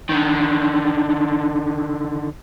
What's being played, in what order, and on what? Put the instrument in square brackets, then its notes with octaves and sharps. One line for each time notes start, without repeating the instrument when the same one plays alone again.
[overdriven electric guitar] D3 D#3